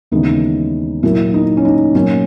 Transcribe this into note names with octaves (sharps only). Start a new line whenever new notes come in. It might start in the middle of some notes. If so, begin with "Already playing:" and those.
D#2 C#3 E3 G#3 B3 D#4
A#2 F#3 A#3 E4
D#4
C#4
D#4
A#2 F#3 A#3 C#4